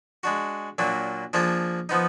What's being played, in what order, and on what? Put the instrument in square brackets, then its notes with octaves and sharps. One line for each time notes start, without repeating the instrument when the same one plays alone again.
[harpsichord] G#3 D4 F#4
A#2 F#3 A#3 D4
F3 A#3 D4 F4 G#4
F3 B3 D#4